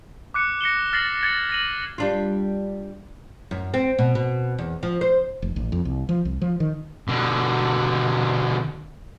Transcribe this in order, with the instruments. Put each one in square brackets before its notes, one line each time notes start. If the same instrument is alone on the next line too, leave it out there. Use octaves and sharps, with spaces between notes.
[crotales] D6 F#6 C#7
A#6 C#7 E7 G7
F6 A6 A#6 C7 F#7 G7
G#6 A6 C#7
A#6 D#7 F#7
[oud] G3 D4 F4
F#2
C4
B2
B2
E2
F3
C5
[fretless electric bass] F1
A1
F2
C2
F3
C2
F3
D#3
[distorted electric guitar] B2 D3